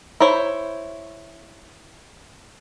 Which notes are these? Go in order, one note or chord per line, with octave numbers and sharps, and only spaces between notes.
E4 C5 C#5